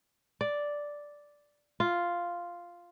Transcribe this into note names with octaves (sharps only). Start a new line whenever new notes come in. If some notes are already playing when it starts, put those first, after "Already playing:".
D5
F4